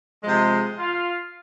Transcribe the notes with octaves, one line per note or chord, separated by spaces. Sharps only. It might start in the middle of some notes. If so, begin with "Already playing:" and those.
C3 F3 G#3
F4 F5